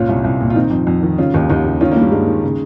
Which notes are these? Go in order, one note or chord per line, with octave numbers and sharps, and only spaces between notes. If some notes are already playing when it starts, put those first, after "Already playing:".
Already playing: C#2 A#2 C#4 F4
C2
C2
A#2
F4
D#3 C4 D#4
F2
F2
D#3
C#3 C#4 F4
D#2 D#4 G4
D#2 D#4 G4
C#3
D#3 C#4 F4
A#3 C#4
G2 G3
G2 G#3
D#3
C#3